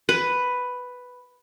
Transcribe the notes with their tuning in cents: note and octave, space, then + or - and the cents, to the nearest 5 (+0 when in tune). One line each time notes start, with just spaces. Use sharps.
B4 +5